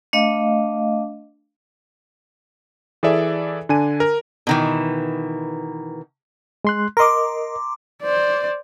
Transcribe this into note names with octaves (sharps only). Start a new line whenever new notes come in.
A3 D4 D#5 F5
E3 G#4 A4 D5 E5
D3 D4 G#5 D#7
A#4
B2 D#3 E3
G#3 C6 F#6
A#4 D#5 A#5 C6 D6
C5 D5